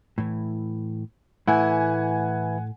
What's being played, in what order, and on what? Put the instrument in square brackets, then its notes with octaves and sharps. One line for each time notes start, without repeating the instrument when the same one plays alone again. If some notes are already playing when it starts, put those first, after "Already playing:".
[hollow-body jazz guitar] A2 E3
[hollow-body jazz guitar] A2 A3 [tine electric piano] E3 E4 [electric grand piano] F#5 G#5